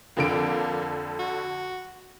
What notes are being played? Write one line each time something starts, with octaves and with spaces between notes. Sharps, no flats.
F2 D3 A#3 D7
F#4